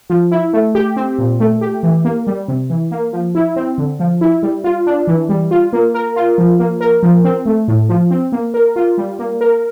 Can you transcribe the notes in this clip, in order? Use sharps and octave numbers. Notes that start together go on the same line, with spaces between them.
F3
E4
A3
G4
C4
A#2
A3
G4
E3
A#3
G3
C3
E3
A#3
F3
E4
C4
D3
F3
E4
G3
F4
D4
E3
G3
F4
A#3
A#4
F4
F3
A#3
A#4
F3
C4
A3
A2
F3
C4
A#3
A#4
F4
G3
A#3
A#4